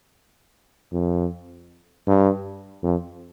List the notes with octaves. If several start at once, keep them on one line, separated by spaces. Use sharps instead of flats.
F2
G2
F2